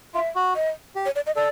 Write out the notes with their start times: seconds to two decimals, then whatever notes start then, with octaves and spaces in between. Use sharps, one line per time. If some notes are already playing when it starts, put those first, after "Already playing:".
0.14 F4 E5
0.35 F#4
0.55 D#5
0.95 G4
1.06 C#5
1.16 D5
1.26 D#5
1.35 A4 D5